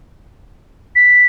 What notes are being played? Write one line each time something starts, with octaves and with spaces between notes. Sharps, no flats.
B6